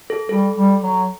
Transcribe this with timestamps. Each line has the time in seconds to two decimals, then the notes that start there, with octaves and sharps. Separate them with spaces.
0.10 A4
0.29 G3 A4
0.56 G3
0.83 F#3